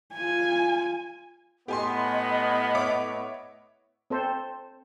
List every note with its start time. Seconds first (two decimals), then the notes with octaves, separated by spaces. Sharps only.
0.14 F4 G#5
1.68 A2 B3 G4 D#5 G#5 C6
2.75 C#5 E5 D6
4.10 C4 A4 C5